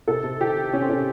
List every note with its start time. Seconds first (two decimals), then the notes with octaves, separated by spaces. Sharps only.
0.08 C3 A4
0.23 C3
0.40 D#3 G4
0.56 D#3
0.72 C3 C#4
0.82 C4
0.89 C3 C#4